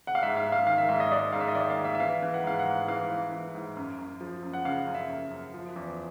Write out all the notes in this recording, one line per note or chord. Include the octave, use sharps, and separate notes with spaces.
F#5
F5
G#2 E5
F5
G#2
F5
D#3 F5
E5
G#2 E5
D#5
G#2 D5
G#2 F5
E5
D#5
D#3 D5
F5
G#2
E5
E5
E3 F5
E3
F#5
G#2 F5
F#5
G#2
E3 F5
E3
E3
G#2
F#2
F#2
F3
F#2
F#5
C#3 F5
F#2
E5
F#2
F#2
F3
E2